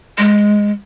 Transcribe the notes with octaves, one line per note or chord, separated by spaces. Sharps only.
G#3